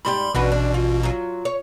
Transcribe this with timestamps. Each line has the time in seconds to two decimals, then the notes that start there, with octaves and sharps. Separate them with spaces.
0.05 G#2 G3 G4 B5 C6
0.35 A1 B2 D4 F#4 B4
0.52 D4
0.74 F4
1.03 F#3 F4
1.45 C#5